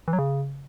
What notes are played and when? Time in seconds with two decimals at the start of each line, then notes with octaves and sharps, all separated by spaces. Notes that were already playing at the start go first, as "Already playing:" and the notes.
0.08 E3
0.13 F#3
0.19 C#3